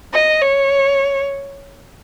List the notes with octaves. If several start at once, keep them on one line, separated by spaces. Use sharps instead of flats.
D#5
C#5